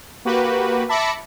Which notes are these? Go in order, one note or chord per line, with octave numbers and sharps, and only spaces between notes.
A#3 F#4 G4 B4
E5 A5 B5 D6 A#6 C#7